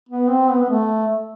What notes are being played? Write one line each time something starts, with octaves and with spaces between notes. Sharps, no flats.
B3
C4
B3
B3
A3